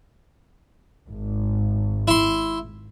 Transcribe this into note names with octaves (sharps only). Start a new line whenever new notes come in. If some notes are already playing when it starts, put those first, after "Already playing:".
G#1
E4 C6